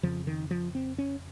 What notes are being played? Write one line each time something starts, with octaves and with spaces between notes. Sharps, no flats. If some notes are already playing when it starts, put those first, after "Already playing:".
F2 C#3 F3
D#3
F3
C4
C#4